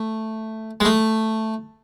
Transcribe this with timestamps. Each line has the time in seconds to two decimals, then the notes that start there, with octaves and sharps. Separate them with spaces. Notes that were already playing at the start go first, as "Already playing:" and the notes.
Already playing: A3
0.80 G#3
0.85 A3